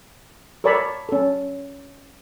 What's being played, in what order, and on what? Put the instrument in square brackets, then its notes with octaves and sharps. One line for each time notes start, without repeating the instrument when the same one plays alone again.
[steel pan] A4 A#4 C#5 D5 A5 B5
C#4 A4